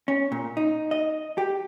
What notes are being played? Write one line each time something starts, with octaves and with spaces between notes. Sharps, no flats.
C#4
A#2
D#4
D#5
G4